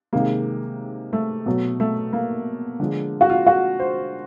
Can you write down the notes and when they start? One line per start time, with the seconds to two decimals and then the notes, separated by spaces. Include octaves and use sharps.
0.13 C3 D#3 G#3 A#3
1.13 A3
1.46 B2 F#3
1.80 A3
2.13 A#3
2.80 D3 F3 G#3
3.21 F#4
3.30 F4
3.47 F#4
3.80 C5